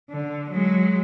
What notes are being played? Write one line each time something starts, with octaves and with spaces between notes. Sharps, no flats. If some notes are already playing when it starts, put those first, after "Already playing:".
D3
F#3 G#3